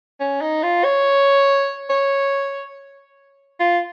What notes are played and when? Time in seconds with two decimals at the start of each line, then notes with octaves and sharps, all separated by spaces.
0.20 C#4
0.41 D#4
0.63 F4
0.84 C#5
1.90 C#5
3.60 F4